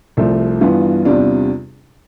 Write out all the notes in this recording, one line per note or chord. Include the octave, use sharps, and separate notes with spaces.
C2 C3 F3 A3 C4
G2 E3 B3 F4
E2 C3 G3 D4 F4